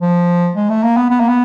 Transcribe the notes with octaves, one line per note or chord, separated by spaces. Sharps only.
F3
G#3
A3
A#3
B3
B3
A#3
B3